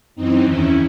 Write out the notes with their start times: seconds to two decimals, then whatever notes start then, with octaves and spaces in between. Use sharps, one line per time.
0.15 F#2 E3 C4 D#4
0.44 E2 D#3 C#4 E4